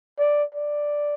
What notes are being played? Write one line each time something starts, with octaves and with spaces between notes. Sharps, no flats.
D5
D5